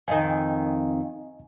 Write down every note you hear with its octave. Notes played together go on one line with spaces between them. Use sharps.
F2 D#3 D#5 G#5